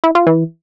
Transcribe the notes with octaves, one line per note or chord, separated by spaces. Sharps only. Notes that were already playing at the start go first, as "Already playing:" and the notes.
E4
F4
E3